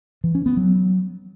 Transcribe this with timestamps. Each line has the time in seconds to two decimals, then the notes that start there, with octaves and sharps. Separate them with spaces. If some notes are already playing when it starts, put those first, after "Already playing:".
0.24 E3
0.35 C#4
0.46 B3
0.57 F#3